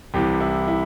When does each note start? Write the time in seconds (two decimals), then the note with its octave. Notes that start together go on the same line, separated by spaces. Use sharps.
0.14 C2 C3 E3 G4
0.40 E4
0.68 E4